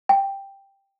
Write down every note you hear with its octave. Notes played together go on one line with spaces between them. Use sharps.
G5